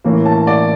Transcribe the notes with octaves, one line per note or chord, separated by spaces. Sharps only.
A2 E3 A#3 C#4
A5
D5